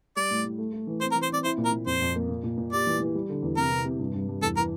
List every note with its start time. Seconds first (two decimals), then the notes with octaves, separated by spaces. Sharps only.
0.16 G3 D5
0.31 A2
0.44 A2
0.58 A3
0.73 A3
0.87 E3
1.01 C4 C5
1.12 A#4
1.15 E3
1.23 C5
1.29 C4 D5
1.44 E4 C5
1.58 A#2
1.65 A#4
1.72 A#2
1.86 F2 C5
2.01 F2
2.15 A#3
2.29 A#2
2.43 A#2
2.58 A#2
2.72 G4 D5
2.87 E3
3.00 E3
3.15 G3
3.29 D3
3.43 E2
3.57 C3 A#4
3.72 C3
3.85 C3
3.99 G2
4.14 G2
4.29 G2
4.42 E2 A4
4.57 E3 A#4